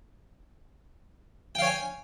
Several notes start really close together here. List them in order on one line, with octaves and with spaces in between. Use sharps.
G5 F5 C#5 G#5